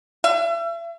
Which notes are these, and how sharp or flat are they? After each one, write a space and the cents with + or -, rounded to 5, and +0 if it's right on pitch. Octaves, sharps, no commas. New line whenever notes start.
E5 +40